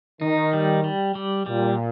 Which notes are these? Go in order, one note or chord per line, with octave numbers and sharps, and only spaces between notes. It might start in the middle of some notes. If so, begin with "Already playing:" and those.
D#3 D#4
G3
G3
G3
A#2 G3